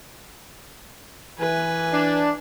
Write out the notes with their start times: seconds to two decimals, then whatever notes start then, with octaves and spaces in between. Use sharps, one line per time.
1.39 E3 B4 G#5
1.92 D4